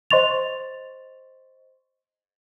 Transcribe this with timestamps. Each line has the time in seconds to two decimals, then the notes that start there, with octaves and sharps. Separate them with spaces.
0.11 C5 D#5 C6 C#6 A6 F7